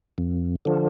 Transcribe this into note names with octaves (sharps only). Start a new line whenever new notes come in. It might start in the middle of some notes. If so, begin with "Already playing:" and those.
F2
D3 F3